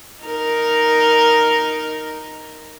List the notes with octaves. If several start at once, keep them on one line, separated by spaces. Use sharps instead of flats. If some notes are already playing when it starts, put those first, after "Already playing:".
D#4 A#4